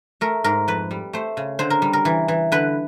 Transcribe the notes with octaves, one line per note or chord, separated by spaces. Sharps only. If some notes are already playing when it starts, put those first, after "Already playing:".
A3 A#4
G#2 A#4
F2 B4
G3
A3 C5
C#3
D3 C5
A#4
G3
A#4
E3
E3
D3 B4